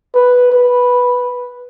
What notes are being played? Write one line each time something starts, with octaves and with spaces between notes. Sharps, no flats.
B4
B4